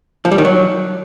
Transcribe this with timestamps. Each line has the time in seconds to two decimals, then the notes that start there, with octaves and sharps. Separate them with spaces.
0.25 F3
0.31 G3
0.38 D#3
0.45 F#3